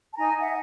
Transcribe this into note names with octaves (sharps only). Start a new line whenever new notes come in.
A5
D#4 G#5 A#5
E5 F#5